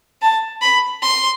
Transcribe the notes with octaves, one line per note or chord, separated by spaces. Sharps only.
A5
B5
C6